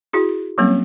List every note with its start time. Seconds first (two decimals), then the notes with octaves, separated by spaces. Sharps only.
0.13 E4 F#4 G#4
0.58 F#3 G3 A#3 C4 C#4